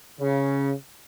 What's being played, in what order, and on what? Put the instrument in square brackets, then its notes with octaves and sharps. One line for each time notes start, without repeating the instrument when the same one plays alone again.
[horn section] C#3